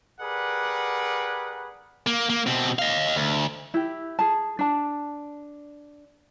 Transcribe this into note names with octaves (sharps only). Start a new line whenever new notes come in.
G4 G#4 A#4 B4 D5 F#5
A#3
A#3
B2 C4
D#5 F5
D2
E4 G4
G#4 A5
D4 A5